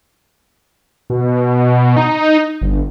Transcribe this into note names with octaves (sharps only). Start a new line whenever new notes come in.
B2
D#4
G1